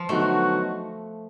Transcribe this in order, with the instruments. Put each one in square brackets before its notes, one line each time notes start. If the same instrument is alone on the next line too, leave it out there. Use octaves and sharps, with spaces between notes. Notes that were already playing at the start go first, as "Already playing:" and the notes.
Already playing: [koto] F3
[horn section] D3 F#3 B3 D#4 F#4 [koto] A3